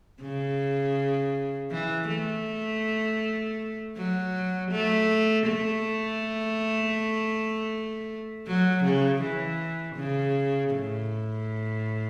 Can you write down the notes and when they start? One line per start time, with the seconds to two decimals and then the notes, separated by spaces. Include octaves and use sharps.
0.21 C#3
1.71 E3
2.09 A3
3.96 F#3
4.71 A3
5.46 A3
8.47 F#3
8.84 C#3
9.22 E3
9.96 C#3
10.71 A2